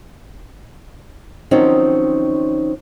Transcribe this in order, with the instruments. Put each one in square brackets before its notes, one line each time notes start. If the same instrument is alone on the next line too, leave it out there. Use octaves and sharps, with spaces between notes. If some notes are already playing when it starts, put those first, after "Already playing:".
[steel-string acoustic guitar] D#3 F3 F#3 C4 C#4 D#4